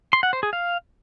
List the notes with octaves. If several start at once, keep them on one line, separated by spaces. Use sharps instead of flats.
C6
F#5
C5
G#4
F5